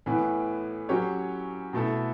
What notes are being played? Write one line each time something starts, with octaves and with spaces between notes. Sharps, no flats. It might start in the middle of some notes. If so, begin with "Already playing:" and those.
A2 E3 B3
F#3 C#4 G4 C#5
B2 A3 E4 A4